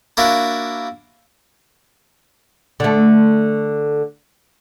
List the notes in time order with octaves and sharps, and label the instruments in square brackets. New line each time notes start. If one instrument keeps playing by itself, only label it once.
[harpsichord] A#3 D4 E4 F#4 C#5
[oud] D3 A3